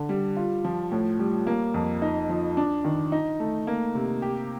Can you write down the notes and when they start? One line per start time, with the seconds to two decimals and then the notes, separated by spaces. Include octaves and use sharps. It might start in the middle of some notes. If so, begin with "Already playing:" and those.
Already playing: D3
0.09 G3
0.37 F4
0.64 F3
0.92 A2
1.19 G3
1.47 A#3
1.74 F2
2.02 D#4
2.29 F3
2.57 D4
2.85 D#3
3.12 D#4
3.40 A3
3.67 A#3
3.95 C3
4.22 G4